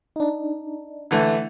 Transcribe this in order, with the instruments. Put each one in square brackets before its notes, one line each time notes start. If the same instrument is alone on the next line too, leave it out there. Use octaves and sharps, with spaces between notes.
[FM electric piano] D4 D#4
[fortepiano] D3 E3 A3